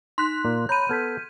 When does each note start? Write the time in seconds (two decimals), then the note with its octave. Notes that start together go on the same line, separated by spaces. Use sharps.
0.18 D#4 C6 F#6 B6
0.45 A#2 A#3
0.69 C#5 A#5 B5 G6 D#7
0.89 B3 A4 F6 G#6 B6